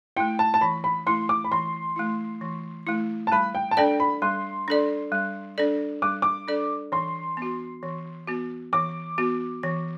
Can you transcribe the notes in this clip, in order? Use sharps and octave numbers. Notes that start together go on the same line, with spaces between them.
A3 E4 G5
A5
A5
E3 B5
B5
A3 E4 C6
D6
B5
E3 C6
A3 E4
E3
A3 E4
A5
G3 B5
G5
A5
D4 A4 D5 G5
B5
G3 C6
D4 A4 D5
G3
D4 A4 D5
G3 D6
D6
D4 A4 D5
E3 C6
B3 F#4
E3
B3 F#4
E3 D6
B3 F#4
E3